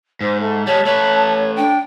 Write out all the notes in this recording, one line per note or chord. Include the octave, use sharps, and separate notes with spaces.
G#2 C5
A3
G3 G#3 C#5 A5
A3 B4 C#5
D4 G5